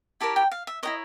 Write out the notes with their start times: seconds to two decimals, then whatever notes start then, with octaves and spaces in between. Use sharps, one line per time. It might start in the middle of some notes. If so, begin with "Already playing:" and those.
0.20 E4 G4 A#4 C#5 A5
0.36 G5
0.52 F5
0.67 E5
0.83 E4 G4 A#4 C#5 D#5